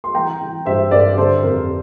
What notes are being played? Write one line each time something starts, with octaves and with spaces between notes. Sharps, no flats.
C6
E3 G5 A#5
E3
G2 C5 E5
G2 A#4 D5
D3 A4 C5
F2 A#4